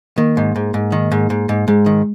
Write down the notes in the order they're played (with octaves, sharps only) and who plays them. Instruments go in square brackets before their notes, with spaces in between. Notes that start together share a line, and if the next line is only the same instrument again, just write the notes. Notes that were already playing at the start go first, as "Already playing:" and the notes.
[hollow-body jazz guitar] D#3 [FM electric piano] A#3
[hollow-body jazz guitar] G#2
G#2
G#2
D#3
G#2
G#2
G#2
[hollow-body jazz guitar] G#2 [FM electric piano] G#3
[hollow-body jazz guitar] D#3